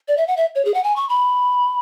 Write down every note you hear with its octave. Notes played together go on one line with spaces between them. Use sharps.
D5
E5
F#5
E5
C#5
G#4
F#5
G#5
C#6
B5